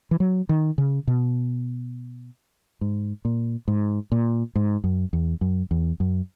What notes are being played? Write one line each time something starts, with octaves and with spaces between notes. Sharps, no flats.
E3
F#3
D#3
C#3
B2
G#2
A#2
G#2
A#2
G#2
F#2
E2
F#2
E2
F#2